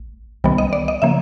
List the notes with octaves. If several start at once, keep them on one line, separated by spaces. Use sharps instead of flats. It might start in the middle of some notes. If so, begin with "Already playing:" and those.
Already playing: A1
C#2 C3 D#3 G3 B3
D#5
D5
D#5
C#3 F3 A#3 E5